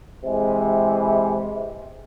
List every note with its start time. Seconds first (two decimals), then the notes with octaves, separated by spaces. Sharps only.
0.24 C3 E3 G#3